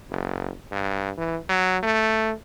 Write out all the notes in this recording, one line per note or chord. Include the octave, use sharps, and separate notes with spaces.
F#1
G2
E3
F#3
A3